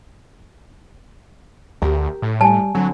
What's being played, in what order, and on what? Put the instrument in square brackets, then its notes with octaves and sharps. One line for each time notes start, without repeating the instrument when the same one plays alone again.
[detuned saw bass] D2 [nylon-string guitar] G4 A#4
[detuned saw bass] A2
[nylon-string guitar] G3 [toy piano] G#5 A5
[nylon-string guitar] D3 C4 [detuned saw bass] F#3